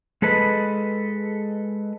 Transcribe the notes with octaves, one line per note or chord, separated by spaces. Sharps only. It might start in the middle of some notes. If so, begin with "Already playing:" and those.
G#3 G#4 A4 B4 D#5